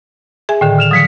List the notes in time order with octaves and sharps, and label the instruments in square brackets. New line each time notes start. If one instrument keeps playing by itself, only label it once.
[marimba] G#4 E5 G#5
[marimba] A2 D3 D#3 [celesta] G5
[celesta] F6 E7 F7
[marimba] D3 F3 F#3 [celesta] D#6 B6 C#7